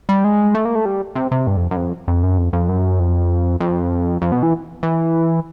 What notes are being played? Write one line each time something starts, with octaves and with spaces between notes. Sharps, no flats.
G3
G#3
A3
A#3
A3
G3
C3
C3
G2
F2
F#2
F2
F2
F#2
F2
F2
F#2
F2
F2
F2
B2
E3
E3